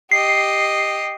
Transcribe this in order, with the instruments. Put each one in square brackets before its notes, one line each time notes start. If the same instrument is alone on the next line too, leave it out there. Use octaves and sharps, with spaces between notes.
[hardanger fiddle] G4 D#5 [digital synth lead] C7